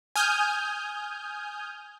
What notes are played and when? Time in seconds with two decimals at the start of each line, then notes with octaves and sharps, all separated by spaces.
0.16 G#5 D#6 F6 G6